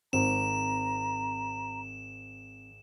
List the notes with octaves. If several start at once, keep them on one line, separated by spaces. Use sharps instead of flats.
G#1 C4 C5 A#5 E7